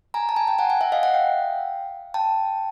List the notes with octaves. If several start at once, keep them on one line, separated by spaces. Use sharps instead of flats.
G#5 A#5
A5
G#5 A#5
G5 A5
F#5 G#5
F#5 G#5
E5 F#5
D#5 F5
E5 F#5
F5 G5
G5 A5